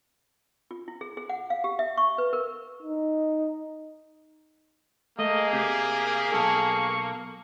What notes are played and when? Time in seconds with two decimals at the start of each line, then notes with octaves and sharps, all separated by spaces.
0.71 F4
0.88 E4
1.01 G#4
1.17 G#4
1.29 F#5
1.50 F5
1.64 G4
1.79 E5
1.97 C#6
2.18 B4
2.33 A#4
2.82 D#4
5.19 A3 A#3 G#4 D#5
5.53 C3 G4
6.33 B1 A4 C#6